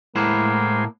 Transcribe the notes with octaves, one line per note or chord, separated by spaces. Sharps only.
A2 G#3 A#3 E4 C5 F#5